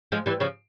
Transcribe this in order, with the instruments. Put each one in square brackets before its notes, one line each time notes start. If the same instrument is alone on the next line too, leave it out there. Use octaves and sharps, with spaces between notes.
[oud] F3 G#3
E3 G3
C#3 F3